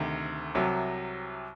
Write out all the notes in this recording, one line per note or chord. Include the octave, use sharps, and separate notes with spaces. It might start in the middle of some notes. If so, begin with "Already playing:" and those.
Already playing: D2 C3 D#3
C2 C3 F#3